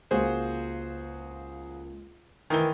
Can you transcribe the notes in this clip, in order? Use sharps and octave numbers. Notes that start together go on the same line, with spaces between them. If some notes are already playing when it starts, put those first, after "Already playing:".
C#2 A#3 F#4 G#4 C5 F5
D#3 E3 A#4 G7